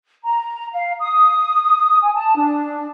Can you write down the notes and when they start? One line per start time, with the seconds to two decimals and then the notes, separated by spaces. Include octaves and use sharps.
0.24 A#5
0.72 F5
0.99 D#6
2.02 G#5
2.14 A5
2.35 D4